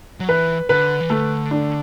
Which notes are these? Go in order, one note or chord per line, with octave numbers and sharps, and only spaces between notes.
F#3
E3 B4
D3 B4
E3
D3 A3
D4